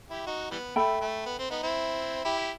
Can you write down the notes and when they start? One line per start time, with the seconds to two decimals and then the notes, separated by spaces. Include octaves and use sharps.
0.10 E4 G4
0.27 D#4 F#4
0.51 E3 G3 B3
0.76 A3 A4 E5 G5 B5
1.01 A3
1.25 B3
1.39 C4
1.50 B3 D#4
1.63 C4 E4
2.25 E4 G4